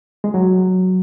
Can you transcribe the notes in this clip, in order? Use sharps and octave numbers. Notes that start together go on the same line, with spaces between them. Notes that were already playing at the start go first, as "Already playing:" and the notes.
G#3
F#3